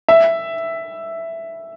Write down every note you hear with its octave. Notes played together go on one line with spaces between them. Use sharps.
E5